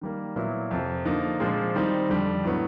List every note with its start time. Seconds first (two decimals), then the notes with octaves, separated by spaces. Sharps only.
0.01 D#3 G3 A#3
0.36 A#2 F#3 B3 E4
0.71 F2 C3 F3
1.05 D3 F3 A#3 D#4
1.40 A#2 F3 G#3 C4
1.75 D#3 G3 C4 D#4
2.09 F2 D3 G3
2.44 A2 F#3 B3